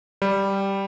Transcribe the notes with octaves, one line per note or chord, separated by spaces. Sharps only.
G3